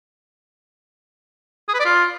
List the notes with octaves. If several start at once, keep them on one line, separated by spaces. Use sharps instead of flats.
G#4
B4
D5
F4